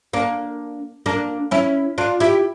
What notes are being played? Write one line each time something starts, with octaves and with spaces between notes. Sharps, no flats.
A#3 D4
A#3 D4
C#4 E4
D4 F4
E4 G4